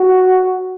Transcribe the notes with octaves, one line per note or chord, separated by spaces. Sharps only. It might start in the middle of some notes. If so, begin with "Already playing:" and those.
Already playing: F#4